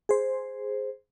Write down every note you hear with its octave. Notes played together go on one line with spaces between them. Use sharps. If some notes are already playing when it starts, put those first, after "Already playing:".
G#4 C5